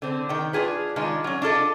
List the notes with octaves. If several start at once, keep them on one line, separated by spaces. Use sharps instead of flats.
D3 C4
D#3 G5
D4 F4 G#4 B4
D#3 G#3 D4 F4
F#3 C#4
D4 F4 A4 D#5